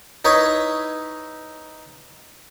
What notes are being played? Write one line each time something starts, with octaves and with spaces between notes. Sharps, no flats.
D#4 E4 B4 C#5